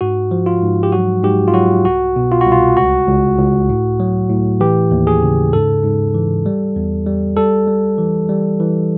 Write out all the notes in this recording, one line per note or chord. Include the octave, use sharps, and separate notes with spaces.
G#2 F#4
F3
F4
G#2
G4
F#3 F#4
G#2 G4
F4
F#3 F#4
C2 F#4
B2
F4
F#4
C2
F4
C#2 F#4
C#2
C#2
A2
F#3
A2
E3 G4
D#2
G#4
C#3
G#2 A4
G#2
E3
G3
E2
G3
G3 A4
G3
E3
G3
E3